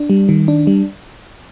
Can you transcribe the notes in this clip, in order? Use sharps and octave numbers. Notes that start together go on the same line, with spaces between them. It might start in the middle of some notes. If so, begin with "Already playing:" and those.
Already playing: D4
G3
D#3
D4
G3